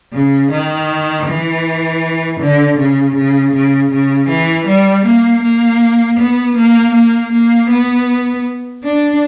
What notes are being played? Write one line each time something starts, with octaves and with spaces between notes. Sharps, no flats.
C#3
D#3
E3
D3
C#3
C#3
C#3
C#3
E3
G3
A#3
A#3
B3
A#3
A#3
A#3
B3
D4